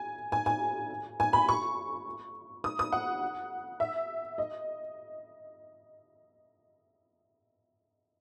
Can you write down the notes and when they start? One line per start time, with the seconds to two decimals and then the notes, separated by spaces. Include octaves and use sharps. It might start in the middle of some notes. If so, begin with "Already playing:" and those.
Already playing: G#5
0.32 G#5
0.46 G#5
1.20 G#5
1.33 B5
1.49 C#6
2.64 D#6
2.79 D#6
2.92 F#5
3.80 E5
4.38 D#5